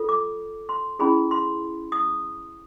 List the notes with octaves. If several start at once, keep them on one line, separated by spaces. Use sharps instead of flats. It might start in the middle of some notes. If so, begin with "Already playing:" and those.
Already playing: F4 A4
D6
C6
C#4 E4 G#4 B5
C6
D#6